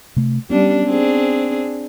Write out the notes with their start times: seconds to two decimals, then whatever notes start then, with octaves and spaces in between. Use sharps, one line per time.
0.16 C3 A3
0.50 G3 B3 C#4 D4
0.85 C4 D4 G#4